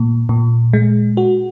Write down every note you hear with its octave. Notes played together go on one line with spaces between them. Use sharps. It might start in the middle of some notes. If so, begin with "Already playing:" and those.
Already playing: A#2
A#2
G#3
F#4